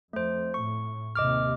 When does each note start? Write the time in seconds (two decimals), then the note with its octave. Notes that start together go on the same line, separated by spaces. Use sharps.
0.13 F2 A3 C5
0.54 A2 C#6
1.15 D#2 C3 D#5 D6 F6